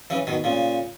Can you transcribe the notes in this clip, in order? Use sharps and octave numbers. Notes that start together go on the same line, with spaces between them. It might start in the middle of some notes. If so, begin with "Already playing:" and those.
C#3 E3
B2 D#3
A#2 C#3